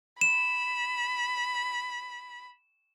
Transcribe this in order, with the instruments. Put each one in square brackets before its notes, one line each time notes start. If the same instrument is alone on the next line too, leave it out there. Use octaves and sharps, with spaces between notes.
[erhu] B5 [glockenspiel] E7